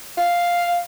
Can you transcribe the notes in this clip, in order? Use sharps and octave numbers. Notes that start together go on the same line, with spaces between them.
F5